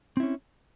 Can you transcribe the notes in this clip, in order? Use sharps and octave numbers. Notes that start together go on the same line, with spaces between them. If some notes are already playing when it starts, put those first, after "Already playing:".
C4 C#4 E4